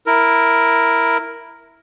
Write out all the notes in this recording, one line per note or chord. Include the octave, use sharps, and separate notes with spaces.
E4 A#4